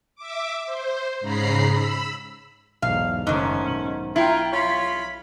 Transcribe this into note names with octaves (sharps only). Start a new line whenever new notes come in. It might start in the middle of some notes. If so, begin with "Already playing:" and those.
E5 D6
C5
G#2 C#3 A#5 B5 C7
B5 E6
B1 E2 G#2 F5
F#1 G#2 D#3 A3 C#4 D#5 G7
B1 F#7
E4 F4 G5 A#5
F4 C#5 B5